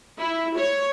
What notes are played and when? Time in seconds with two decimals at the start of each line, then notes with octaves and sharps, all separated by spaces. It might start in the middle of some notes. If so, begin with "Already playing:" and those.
0.19 E4
0.58 C#5